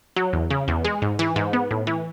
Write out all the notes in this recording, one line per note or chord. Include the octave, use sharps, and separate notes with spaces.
F#3
E2
C#3
E2
G#3
G#2
E3
G#2
B3
A2
E3